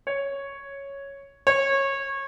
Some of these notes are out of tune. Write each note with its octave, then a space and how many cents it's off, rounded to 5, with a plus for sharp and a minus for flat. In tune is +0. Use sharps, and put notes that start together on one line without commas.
C#5 +0
C#5 -20